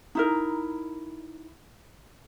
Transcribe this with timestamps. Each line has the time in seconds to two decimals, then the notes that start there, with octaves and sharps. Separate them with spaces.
0.15 D#4 E4 A#4